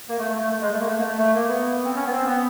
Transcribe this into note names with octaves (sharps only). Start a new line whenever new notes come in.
A#3
A3
A3
A3
A3
G#3
A3
A#3
A3
A#3
A3
A3
A#3
B3
C4
C#4
B3
C4
B3